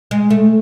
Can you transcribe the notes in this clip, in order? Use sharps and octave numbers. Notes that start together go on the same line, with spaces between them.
G#3
A3